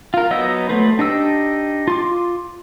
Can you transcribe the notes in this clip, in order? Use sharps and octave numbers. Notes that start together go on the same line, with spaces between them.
F4 A#4
F#3 B3 D#4 D#5 E6
F#3 A3 B4 C5
D4 D#4 G4 E6
F4 C6 D6